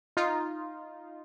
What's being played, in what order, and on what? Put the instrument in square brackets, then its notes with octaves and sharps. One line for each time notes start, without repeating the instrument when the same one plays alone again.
[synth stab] D#4 F4